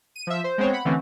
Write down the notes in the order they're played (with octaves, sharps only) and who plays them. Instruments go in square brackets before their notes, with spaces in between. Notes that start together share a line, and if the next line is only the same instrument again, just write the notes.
[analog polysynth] D#7
F3 E5
C5
G#3 B3 C4 C5 C#5
F#5 B5
D3 E3 A3 C4 C#4